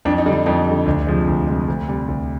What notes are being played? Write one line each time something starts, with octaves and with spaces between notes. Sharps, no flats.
F2 D4
D#4
D3 G3
D#4
F2 D#4
D3 G3
D2 D4
C3 F3 G#3
D2
C3 F3 G#3
D2
C3 G3
D2